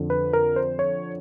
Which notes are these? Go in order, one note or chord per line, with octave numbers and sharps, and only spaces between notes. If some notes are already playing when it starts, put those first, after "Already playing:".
Already playing: F2 D3
B4
A#4
C5
C#5